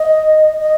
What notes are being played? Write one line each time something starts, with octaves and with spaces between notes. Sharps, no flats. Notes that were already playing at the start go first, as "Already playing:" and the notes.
Already playing: D#5
D#5